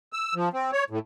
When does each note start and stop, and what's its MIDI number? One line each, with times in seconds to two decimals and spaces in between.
0.13 0.34 88
0.35 0.49 53
0.53 0.71 60
0.72 0.84 73
0.90 0.99 45